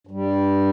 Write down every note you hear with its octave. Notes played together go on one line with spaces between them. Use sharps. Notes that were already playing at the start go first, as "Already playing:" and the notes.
G2 G3